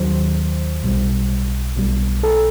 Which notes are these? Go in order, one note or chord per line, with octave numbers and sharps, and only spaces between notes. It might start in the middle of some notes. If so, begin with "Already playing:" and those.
Already playing: D#2 D#3 F#3 C5
B1 B2 G3
B1 B2 G3
A4